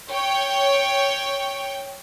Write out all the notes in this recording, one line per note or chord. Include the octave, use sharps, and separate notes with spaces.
C#5 G5